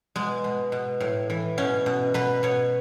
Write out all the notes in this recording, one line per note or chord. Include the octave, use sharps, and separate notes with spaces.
B2 G#3
B2
B2
A2
E3
B2 C#4
B2
B2 B4
B2 C#5